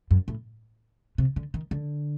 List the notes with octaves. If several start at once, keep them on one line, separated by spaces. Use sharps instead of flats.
F#2
A2
C3
D3
D#3
D3